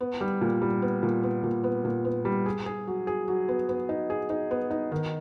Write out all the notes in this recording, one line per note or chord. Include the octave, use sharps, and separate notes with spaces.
B3
G3
A#2
G3
B3
A#2
B3
A#2
B3
A#2
B3
G3
G#4
G#4
F#3
G#4
F#3
B3
B3
D#4
G#4
D#4
B3
D#4
D#3